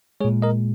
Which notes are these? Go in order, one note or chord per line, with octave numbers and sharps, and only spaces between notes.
A#2 G#3 G#4 C#5
A#4 D#5